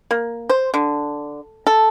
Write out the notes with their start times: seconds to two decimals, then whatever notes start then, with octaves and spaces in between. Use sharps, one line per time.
0.11 A#3
0.49 C5
0.74 D3
1.67 A4